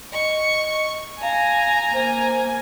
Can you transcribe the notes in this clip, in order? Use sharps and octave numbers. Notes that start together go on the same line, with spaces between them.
D#5 C#6
F5 G#5 A#5
A#3 C5 G#5